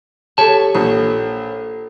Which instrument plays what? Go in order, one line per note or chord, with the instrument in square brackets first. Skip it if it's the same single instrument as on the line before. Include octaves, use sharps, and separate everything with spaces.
[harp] G4 A4 [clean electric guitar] C#5 A5
[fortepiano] A#1